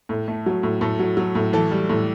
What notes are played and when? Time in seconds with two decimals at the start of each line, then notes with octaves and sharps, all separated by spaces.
0.09 A2
0.28 A3
0.46 F#3
0.63 A2
0.81 A2 A4
0.99 F#3
1.17 F#3
1.35 A2
1.53 E3 A4
1.71 G3
1.89 A2